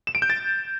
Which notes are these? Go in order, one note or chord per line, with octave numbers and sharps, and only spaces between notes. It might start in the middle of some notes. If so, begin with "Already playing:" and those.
E7
D7
G6
A6